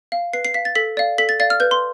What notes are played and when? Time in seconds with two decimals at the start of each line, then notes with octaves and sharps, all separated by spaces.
0.12 F5
0.33 B4 C7
0.45 C7
0.54 F5 B6
0.65 A6
0.75 A4 B6
0.97 D5 F5
1.18 A4 B6
1.29 A6
1.40 D5 F5 A6
1.50 F6
1.60 B4 G6
1.71 C6